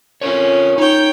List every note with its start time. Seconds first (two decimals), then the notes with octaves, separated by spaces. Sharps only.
0.21 C#4 F4 A#4 C#5
0.78 D#4 C#5 G5